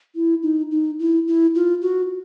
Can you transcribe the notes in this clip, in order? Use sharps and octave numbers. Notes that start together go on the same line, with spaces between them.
E4
D#4
D#4
E4
E4
F4
F#4